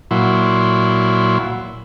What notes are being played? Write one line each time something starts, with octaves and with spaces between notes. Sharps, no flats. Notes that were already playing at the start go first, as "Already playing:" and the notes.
A#2 F#3 E4 C6